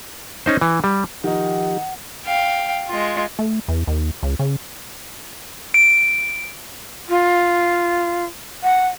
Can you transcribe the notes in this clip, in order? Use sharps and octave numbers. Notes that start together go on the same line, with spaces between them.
C#4 D#4 C5
E3
G3
D#3 F3 D#4 G4 F#5
F5 G5
G#3 F4
A3
E2
D#2
C#2
C#3
D7
F4
F#5